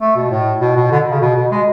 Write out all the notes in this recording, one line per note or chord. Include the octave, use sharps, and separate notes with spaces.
A3
B2
A2
B2
B2
D3
C#3
B2
B2
G#3